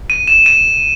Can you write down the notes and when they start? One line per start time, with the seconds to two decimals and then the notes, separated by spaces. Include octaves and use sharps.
0.10 D#7
0.28 E7
0.46 D#7